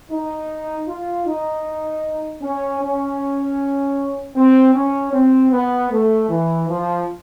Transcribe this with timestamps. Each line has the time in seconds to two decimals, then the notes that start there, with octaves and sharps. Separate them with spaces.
0.11 D#4
0.88 F4
1.27 D#4
2.42 C#4
2.81 C#4
4.36 C4
4.74 C#4
5.13 C4
5.52 B3
5.91 A3
6.29 E3
6.69 F3